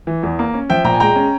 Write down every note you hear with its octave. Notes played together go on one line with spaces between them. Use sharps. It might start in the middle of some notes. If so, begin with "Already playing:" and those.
E3
E2
A#3
C#4
F3 E5 G5
A#2 G5 A#5
G#5
G#3 G5 A#5
C#4